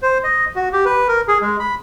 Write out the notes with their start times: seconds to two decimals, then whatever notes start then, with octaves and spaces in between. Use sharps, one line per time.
0.02 C5
0.24 D#5
0.56 F#4
0.73 G4
0.85 B4
1.08 A#4
1.28 G#4
1.42 G#3
1.60 B5